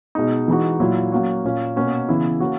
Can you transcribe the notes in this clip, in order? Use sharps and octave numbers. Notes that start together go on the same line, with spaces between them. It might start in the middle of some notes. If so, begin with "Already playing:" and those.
B2 G#3 B3 D#4
E3 G#3 D#4 F#4
A#2 F#3 A#3 E4
F#3 A#3 C#4 F#4
A#2 A#3 C#4
B2 A#3 C#4 F#4
C#3 E3 B3 E4
A#3 C#4 F#4